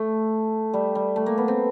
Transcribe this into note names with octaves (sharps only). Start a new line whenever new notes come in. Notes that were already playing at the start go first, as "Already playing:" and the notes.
Already playing: A3
G3
G3
A3
A#3
B3
C4